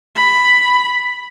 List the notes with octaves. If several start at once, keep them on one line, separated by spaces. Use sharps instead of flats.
B5